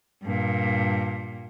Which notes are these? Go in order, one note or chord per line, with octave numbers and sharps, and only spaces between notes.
G2 A#2